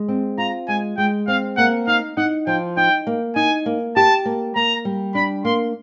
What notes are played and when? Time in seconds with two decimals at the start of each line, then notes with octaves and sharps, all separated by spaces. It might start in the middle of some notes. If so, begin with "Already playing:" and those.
Already playing: G#3
0.09 C4
0.38 F4 A#5
0.68 G#3 G#5
0.98 G#3 G5
1.28 C4 F5
1.57 A#3 F#5
1.87 D#4 F5
2.17 D#4 F#5
2.47 F3 G5
2.77 D#4 G5
3.07 A#3
3.36 D#4 G#5
3.66 A#3
3.96 G4 A5
4.25 A#3
4.56 A#3 A#5
4.85 G3
5.15 D4 B5
5.45 A#3 C6